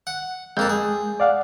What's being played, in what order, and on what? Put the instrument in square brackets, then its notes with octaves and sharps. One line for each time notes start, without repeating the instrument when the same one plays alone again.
[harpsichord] F#5
[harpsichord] F2 A#3 A5 [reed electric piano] G#3 G6
[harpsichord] G#4
[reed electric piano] D5 F5 F#5